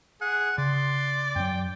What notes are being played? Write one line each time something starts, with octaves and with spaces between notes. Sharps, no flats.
G#4 F#5
C#3 D5 C6
F#2 F#3 G5